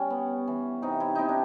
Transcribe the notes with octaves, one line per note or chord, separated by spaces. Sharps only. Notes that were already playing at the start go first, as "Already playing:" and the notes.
Already playing: G3 C#4
B3
E3
C3 D#4
E4
C3 D#4 E4
D4